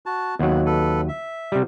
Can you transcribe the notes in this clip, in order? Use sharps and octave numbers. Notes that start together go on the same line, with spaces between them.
F#4 A5
D#2 F#3 B3
A4 B4
E5
C3 G3